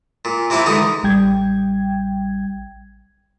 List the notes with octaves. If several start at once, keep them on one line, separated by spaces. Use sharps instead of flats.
A#2
C3 A#3 E4 F4 C5
D3 E3 G#3 D#4
A1 G3 G5 G#6